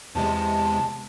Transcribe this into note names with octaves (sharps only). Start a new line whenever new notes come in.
E2 C3 G#3 A5